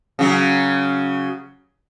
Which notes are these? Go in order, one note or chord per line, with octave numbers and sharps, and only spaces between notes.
C#3 F#3